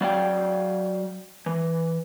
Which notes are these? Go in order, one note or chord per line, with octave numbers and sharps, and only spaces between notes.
F#3 D5 F5 G5
E3